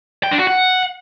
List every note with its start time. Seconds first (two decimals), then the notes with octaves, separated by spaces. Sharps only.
0.23 G5
0.31 D4
0.39 F#4
0.47 F#5